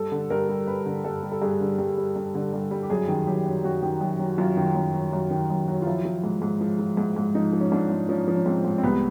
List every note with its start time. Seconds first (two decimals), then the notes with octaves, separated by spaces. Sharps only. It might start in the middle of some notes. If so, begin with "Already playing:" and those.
Already playing: G2 A4
0.12 D3
0.30 G2 A#4
0.49 G3
0.67 G2 B4
0.86 D3
1.04 G2 A4
1.23 G3
1.32 A4
1.42 G2 G#4
1.60 D3
1.79 G2
1.97 G3
2.16 G2
2.35 D3
2.53 G2
2.71 G3
2.83 G4
2.90 F#2 G#4
3.08 D#3
3.27 F#2 G4
3.45 F#3
3.64 F#2 F#4
3.82 D#3
4.01 F#2
4.19 F#3
4.38 F#2 F4
4.57 D#3
4.75 F#2
4.94 F#3
5.13 F#2
5.31 D#3
5.50 F#2
5.68 F#3
5.82 F4
5.86 F3 E4
6.05 F3
6.24 G#2
6.42 G#2
6.61 F3
6.79 F3
6.97 G#2
7.16 G#2
7.35 F3 D#4
7.53 F3
7.61 C#4
7.72 G#2 D4
7.90 G#2
8.09 F3 C#4
8.28 F3
8.35 C#4
8.46 G#2 C4
8.65 G#2
8.78 C4
8.83 C2 B3